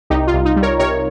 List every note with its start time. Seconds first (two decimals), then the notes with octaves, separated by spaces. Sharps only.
0.10 C2 D#4 G4
0.27 F4
0.34 C2
0.45 D#4
0.56 G3
0.63 A#4 C#5
0.79 C3 A#4 C#5